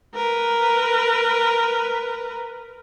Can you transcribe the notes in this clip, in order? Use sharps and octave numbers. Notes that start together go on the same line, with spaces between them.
A#4 B4